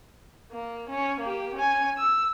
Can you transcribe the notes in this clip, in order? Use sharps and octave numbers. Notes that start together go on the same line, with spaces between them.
A#3
C#4
A#3 G4
C#4 G#5
E6